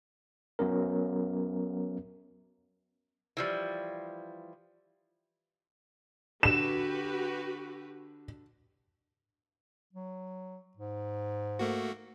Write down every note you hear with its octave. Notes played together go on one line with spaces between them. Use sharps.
F#3 B3 C#4 A#4
E3 F3 G3
D3 F#4 G4 B4 E7
F#3
G#2
A3 A#3 F#4